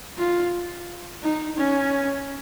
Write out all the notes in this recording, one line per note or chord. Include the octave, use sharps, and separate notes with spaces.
F4
D#4
C#4